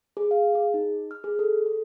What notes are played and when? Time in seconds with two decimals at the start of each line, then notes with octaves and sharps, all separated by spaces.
0.17 G#4
0.31 F5
0.55 G#4
0.74 D#4
1.11 F6
1.24 G#4
1.39 A4
1.66 A4